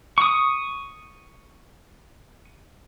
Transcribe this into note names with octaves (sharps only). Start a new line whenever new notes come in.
C#6 D#6